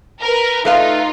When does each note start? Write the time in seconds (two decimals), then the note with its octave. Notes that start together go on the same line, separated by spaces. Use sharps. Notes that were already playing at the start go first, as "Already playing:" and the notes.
0.22 A#4 B4
0.65 A3 D#4 F4 B4 F5